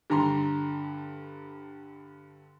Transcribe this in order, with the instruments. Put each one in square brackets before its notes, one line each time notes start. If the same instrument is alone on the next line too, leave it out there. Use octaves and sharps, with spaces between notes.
[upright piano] G2 D3 A#5 C6